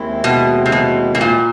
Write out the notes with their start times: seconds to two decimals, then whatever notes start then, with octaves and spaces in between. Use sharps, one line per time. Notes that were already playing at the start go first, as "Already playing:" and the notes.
Already playing: D#2 D#3 G#3 C4 E4
0.24 B2
0.66 C3
0.72 B2
1.15 B2
1.21 A#2